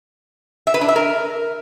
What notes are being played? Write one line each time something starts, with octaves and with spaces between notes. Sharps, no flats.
E5
B4
D4
E5
A#4